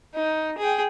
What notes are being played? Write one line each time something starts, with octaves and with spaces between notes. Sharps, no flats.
D#4
G#4 G5